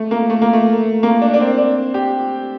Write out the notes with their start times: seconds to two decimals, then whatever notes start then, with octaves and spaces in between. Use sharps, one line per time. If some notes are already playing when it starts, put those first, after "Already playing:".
Already playing: A3
0.11 A#3
0.30 A3
0.42 A#3
0.53 A3
1.03 A#3
1.22 D4
1.34 D4
1.40 C4
1.58 D4
1.94 G4